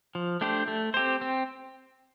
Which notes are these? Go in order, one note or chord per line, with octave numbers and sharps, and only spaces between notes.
F3
A3 D4 G4 C5
A3
C4 G4 C5
C4